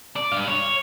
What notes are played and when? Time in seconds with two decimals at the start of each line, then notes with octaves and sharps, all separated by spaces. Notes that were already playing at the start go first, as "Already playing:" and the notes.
0.16 D5
0.32 G2 F5
0.48 C#5